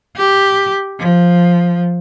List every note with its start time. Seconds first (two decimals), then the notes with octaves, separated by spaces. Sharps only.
0.17 G4
0.99 F3